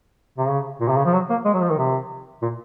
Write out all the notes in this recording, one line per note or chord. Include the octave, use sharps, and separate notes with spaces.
C3
C#3
A#2
C3
C#3
F3
F#3
A#3
G#3
F#3
F3
D#3
C3
A#2